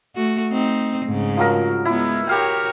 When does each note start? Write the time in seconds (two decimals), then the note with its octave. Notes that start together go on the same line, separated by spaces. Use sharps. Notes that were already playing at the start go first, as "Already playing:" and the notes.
0.15 A3 F#4
0.52 C4 D#4
1.06 G#2 C#3
1.37 F3 F#3 A#4
1.85 G#3 B3 E4
2.27 F#4 G4 A#4 C#5 F5 G5